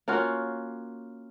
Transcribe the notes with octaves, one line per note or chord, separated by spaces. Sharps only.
A#3 C#4 F4 F#4